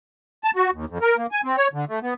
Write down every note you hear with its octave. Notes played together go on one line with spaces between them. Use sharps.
A5
F#4
D#2
F2
A#4
A#3
G#5
C4
C#5
D3
A3
B3